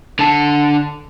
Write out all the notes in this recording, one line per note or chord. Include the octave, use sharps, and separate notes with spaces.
D3 A5